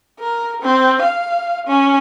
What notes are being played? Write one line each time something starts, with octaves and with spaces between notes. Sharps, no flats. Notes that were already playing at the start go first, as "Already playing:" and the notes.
A#4
C4
F5
C#4